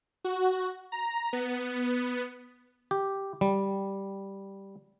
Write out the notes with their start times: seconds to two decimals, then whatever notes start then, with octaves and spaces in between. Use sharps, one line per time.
0.24 F#4
0.92 A#5
1.33 B3
2.91 G4
3.41 G3